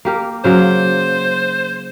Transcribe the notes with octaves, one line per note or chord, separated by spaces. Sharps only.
A#3 G4 A#4
C#3 F#3 A#3 C5